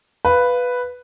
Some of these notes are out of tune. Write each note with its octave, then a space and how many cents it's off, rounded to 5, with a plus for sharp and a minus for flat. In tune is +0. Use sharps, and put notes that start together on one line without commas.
B4 +0 F5 +0